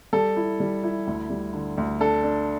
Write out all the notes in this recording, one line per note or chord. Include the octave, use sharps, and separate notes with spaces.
G3 A4
E4
G3
E4
D2
G3
D3
D2
D4 A4
D4